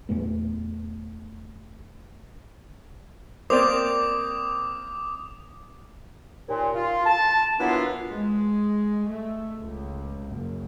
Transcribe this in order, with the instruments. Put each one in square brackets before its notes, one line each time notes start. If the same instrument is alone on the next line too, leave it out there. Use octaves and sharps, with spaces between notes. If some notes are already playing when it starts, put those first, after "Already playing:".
[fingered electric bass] E2 A#2 A3 B3
[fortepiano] A#3 C4 [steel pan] C5 D5 [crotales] D6 D#6 F7
[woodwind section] D#2 A#2
F4
A5
E3 F#3 A#3 B3 D4 F4
[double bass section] G#3
A3
C#2
F#1